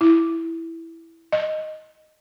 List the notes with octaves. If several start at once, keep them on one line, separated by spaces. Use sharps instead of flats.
E4
D#5